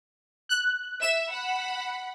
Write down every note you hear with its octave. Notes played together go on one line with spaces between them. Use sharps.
F#6
E5 E7
F#5 B5